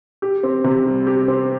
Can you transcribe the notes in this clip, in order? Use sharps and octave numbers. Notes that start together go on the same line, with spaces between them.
G4
C4
C3
G3
G4
C4